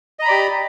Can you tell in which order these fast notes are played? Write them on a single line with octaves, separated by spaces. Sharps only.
D#5 A#5 B5 D5 G4